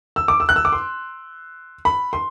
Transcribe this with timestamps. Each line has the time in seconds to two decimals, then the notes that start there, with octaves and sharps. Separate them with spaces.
0.16 E6
0.28 D6
0.40 E6
0.49 F#6
0.56 E6
0.65 D6
0.72 C6
1.85 B5
2.13 C6